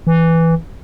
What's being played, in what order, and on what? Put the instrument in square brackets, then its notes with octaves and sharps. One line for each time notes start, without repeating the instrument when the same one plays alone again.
[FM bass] E3